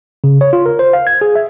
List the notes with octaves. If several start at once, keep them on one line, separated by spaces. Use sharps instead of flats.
C#3
C#5
F4
A#4
C5
F5
G#6
G#4
E5